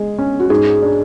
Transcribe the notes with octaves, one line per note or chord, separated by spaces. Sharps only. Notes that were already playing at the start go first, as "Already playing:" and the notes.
Already playing: G#3 G#4
C#4
F#4
G#2 G#4
D4